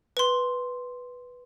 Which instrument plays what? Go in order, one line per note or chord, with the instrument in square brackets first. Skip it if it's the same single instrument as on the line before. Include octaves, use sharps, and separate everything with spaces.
[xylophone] B4 C6